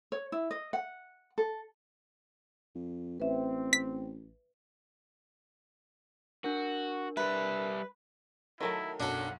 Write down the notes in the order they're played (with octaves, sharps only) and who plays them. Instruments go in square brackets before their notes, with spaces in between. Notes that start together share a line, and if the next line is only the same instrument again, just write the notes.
[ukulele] C#5
E4
D#5
F#5
A4
[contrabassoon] F2
[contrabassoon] A1 [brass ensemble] C4 [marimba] B4 E5
[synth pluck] B6
[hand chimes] D4 A#4 [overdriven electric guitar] F#4
[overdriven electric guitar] G3 E5 [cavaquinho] B4
[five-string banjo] D#3 F#3 A3 [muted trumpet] E4 [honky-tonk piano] A4 A#4
[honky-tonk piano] B1 F#2 [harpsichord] D4 A4 [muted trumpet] F#5